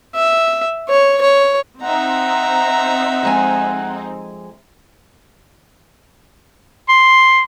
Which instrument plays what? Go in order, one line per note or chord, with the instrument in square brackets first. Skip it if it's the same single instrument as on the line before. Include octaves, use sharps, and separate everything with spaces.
[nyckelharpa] E5
C#5
C#5
[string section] C4 D#4 [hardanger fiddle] E5 A#5 [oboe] F#5
[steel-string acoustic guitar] F2 G#3 G#5
[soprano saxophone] C6